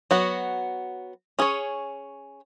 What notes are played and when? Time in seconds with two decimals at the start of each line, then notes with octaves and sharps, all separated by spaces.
0.11 F#3 B3 F#4
1.39 C#4 G#4 C#5